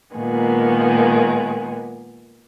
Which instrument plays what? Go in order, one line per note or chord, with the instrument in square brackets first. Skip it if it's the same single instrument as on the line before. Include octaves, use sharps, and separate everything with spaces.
[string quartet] A#2 D#3 G#3 B3